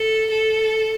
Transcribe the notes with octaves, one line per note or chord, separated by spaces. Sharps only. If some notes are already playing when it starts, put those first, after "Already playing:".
Already playing: A4
A4